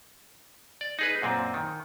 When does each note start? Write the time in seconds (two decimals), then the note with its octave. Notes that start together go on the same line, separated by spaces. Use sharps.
0.81 D5
0.99 D#4 G#4 B4
1.22 F#2 A#2 C4
1.54 D#3